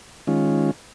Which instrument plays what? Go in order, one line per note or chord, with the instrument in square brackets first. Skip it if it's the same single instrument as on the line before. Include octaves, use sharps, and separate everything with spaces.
[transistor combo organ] D#3 G#3 C#4 F4